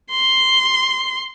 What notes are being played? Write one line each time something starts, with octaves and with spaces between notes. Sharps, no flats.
C6